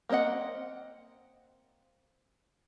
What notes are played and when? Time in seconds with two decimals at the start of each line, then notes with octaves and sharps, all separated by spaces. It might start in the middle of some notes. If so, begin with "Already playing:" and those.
0.09 A#3 C4 A#4 D#5 F#5